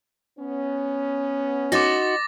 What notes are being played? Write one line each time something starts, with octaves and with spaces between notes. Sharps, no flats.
B3 C#4
D#4 F#4 C5 D6 A6 A#6